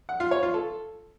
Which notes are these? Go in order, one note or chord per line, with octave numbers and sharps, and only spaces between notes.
F#5
F4
C#5
F4
A4